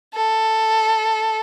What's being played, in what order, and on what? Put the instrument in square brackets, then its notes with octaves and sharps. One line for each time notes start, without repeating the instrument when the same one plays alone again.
[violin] A4